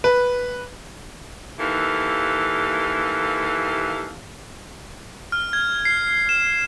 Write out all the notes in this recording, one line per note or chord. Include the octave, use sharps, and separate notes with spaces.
B4
D#2 E3 A4 F5
F6
G#6
C7
E7